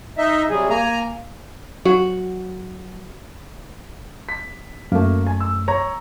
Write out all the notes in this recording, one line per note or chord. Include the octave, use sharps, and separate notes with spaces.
D#4 D#5 E5
C3 F#3 G3 G#4
A#3 G#5 A#5
F#3 F#4
B6
F#2 A3 A#3
G#5
E6
C#5 A#5